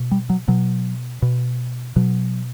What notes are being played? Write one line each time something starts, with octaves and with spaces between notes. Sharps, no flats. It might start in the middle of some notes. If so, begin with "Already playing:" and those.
Already playing: B2
G3
F#3
B2 F#3
B2
B2 F#3